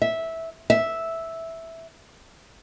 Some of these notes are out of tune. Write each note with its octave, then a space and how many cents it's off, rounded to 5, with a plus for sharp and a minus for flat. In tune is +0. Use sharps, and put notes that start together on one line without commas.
E5 -10
E5 -5